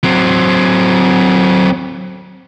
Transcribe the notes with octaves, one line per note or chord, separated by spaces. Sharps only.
F#3 C4